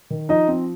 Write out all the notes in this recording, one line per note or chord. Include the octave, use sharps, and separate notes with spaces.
D#3
F3 D#4 D#5
C4